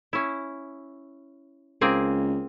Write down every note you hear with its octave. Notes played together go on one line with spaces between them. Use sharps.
C#4 E4
C#2 A#3 C4 G#4